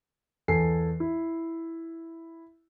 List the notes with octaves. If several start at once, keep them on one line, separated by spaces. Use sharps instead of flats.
E2 A4 G#5 C7
E4